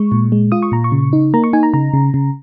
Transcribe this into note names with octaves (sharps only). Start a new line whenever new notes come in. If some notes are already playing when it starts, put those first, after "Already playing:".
Already playing: G#3 C#6
A#2
G#3
F4 D#6
C#6
A#2 A#5
C#6
C#3
D#4
A#3 A#5
C#6
D#4 G#5
A#5
C#3 A#5
C#3
C#3